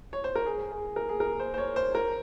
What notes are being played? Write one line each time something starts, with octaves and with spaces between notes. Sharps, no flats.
C#5
C5
A#4
G#4
G#4
A#4
G#4
A#4
C5
C5
C#5
C5
A#4